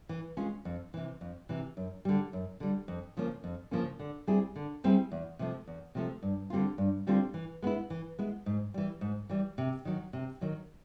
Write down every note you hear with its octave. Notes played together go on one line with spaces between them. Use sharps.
E3
G#3 C#4 F4
F2
C3 E3
F2
C3 E3
F#2
D3 G3
F#2
D3 G3
F2
C#3 F3 A#3 C#4
F2
C#3 F3 A#3 C#4
D3
G3 C4 E4 G#4
D3
G3 C4 E4 G#4
E2
C3 F3 A3
E2
C3 F3 A3
G2
D3 G3 C4 F4
G2
D3 G3 C4 F4
E3
G#3 B3 E4
E3
G#3 B3 E4
G#2
E3 G3
G#2
E3 G3
C3
D#3 F#3
C3
D#3 F#3